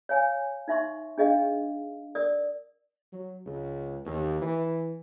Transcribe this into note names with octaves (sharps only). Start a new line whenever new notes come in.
C#5 F5 G#5
D#4 E5 C6 C#6
D4 G#4 D#5 F5
A#4 D5 D#6
F#3
C#2
D#2
E3